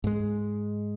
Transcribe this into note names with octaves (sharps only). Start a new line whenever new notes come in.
G#2 G#3